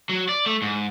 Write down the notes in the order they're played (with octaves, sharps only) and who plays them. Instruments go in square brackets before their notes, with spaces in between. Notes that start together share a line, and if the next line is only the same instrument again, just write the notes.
[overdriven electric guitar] F#3
D5
A3
G#2